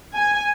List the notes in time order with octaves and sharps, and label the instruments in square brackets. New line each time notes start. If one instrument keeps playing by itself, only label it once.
[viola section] G#5